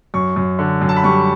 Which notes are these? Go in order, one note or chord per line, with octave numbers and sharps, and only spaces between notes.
F#2 C#6
F#2
D3
F#2
A5
B5
G3 C#6